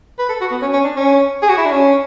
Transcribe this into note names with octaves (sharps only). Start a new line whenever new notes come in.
B4
A4
F#4
B3
C#4
C#4
D4
C#4
G#4
F#4
E4
D4
C#4